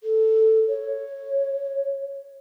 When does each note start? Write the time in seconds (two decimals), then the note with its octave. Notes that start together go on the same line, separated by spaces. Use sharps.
0.03 A4
0.68 C#5